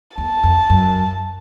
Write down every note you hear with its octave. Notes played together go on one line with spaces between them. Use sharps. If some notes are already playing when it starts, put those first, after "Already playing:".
E2 A5
F2
F#2